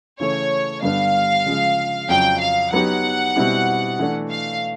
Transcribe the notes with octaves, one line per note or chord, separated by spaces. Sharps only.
C#3 E3 A3 C#5
G2 D3 G3 B3 D4 F5
C#3 F3 G#3
F2 C#3 F#3 G5
F5
F#3 B3 D#4 G4 F#5
B2 G3 C4 E4 G4
E3 A3 D4
F5